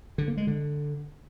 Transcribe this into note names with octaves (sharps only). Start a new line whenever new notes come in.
D3
A#3
G#3
D3